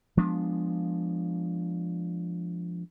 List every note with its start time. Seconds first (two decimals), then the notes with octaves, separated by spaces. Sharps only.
0.17 F3 G#3 B3 D4